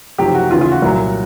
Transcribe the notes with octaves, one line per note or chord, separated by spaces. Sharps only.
F#1 F2 C3 D#3 F#3 G4
F#4
D#2 C#3 E3 F4
F4
F#4
C2 A#2 F#3